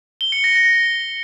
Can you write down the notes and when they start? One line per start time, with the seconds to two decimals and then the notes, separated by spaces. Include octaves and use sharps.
0.21 G7
0.32 C#7
0.44 A#6
0.56 A#6